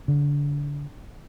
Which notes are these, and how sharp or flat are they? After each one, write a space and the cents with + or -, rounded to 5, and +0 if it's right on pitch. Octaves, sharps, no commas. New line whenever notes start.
D3 -30